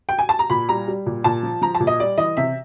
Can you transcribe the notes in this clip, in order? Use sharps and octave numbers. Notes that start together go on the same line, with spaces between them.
G5
G#5
A5
A#5
A#2 B5
G3 A#5
G3
A#2
A#2 A5
F3
F3 A#5
A5
A#2
D#5
G3 D5
E3 D#5
C3 E5